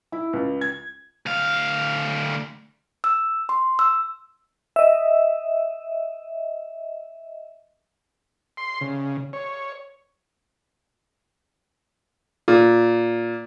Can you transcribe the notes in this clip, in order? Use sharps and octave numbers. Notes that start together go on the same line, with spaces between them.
E4
C#2
G#6
D2 F5
E6
C6
E6
D#5 E5
C6
C#3
C#5
A#2